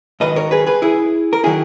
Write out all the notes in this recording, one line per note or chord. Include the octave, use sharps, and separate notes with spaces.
G#2 D#3 F#3 B4 D#5
A#4 C#5
G#4 B4
G#4 B4
E4 G#4
A#4
D#3 F#3 E4 G#4